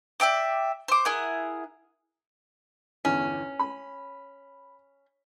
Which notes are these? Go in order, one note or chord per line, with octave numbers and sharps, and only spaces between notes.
D5 E5 G5 D6
C5 D6
E4 G#4 A#4 F#5
G1 E2 C#4
B5